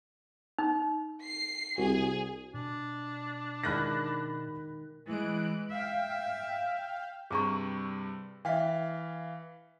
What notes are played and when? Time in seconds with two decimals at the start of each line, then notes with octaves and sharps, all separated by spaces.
0.59 D#4
1.24 C7
1.78 C2 F#4 G#4
2.54 B2 D4
3.63 D#3 G#3 E4 B5 F#6 A#6
5.07 E3 G#3 F#6 D7
5.71 E5 F5 G5
7.31 G2 C3 G3 G#4 A#5 C#6
8.45 E3 E5 F5 G5 B6